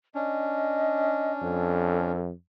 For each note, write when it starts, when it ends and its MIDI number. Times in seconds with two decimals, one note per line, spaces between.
0.15 2.12 61
0.15 2.12 62
0.15 1.33 75
1.42 2.31 41
1.42 2.20 69